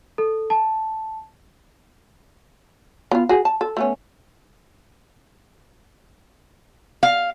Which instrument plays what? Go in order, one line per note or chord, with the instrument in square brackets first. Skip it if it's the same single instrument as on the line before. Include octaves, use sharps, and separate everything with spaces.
[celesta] A4
A5
[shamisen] B3 F4
F#4 G#4
A5
A4
A3 B3 C#4
[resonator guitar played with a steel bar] F5